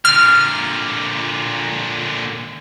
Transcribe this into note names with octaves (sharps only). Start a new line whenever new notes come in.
A#2 D3 F6